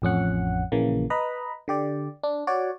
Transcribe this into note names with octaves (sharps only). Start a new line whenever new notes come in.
A1 F2 C#4 F#5
A#1 C#3 E3 A#3
B4 D#5 A#5 B5
D3 G4 D5
D4
F#4 C#5 D5